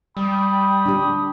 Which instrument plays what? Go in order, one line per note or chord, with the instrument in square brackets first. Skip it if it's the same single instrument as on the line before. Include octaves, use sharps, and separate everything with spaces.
[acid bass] G3 [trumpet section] G5 B5 D#6
[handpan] D4 G4